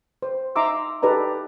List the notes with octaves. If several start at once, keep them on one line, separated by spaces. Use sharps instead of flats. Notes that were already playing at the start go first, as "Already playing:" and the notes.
C5
D#4 E5 A#5 C6 D6 E6
D#4 G4 A4 B4 D5 A#5